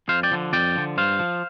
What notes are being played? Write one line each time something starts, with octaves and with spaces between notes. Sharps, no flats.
F2 C5 F5
D5 G5
D3 F3
F2 D5 G5
D3 F3
G2 C5 F5
F3